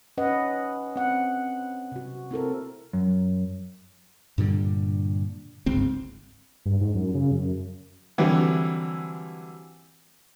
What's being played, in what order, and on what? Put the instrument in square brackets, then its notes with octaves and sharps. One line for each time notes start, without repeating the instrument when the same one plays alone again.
[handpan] C#4 B4 D#5 F#5
C4 F#5
C3 F#4
C4 E4 A4 A#4
[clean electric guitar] F#2
[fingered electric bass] G2 A#2 D3 G3
G1 C#2 G#2 C4
[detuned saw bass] G2
G#2
F#2
C#3
F#2
[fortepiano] D3 E3 F#3 G3 C4